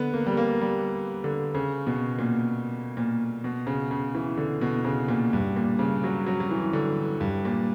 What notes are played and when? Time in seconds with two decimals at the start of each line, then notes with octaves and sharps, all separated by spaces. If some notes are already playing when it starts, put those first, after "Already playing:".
Already playing: D3 B3
0.14 A#3
0.26 G3
0.37 A#3
0.61 G3
1.24 D3
1.55 C#3
1.87 B2
2.19 A#2
2.97 A#2
3.44 B2
3.67 C#3
3.91 C#3
4.15 E3
4.37 D3
4.61 B2
4.85 C#3
5.08 A#2
5.33 G2
5.56 A#2
5.79 C#3
6.04 F#3
6.26 F#3
6.40 F#3
6.51 E3
6.73 D3
7.21 G2
7.45 A#2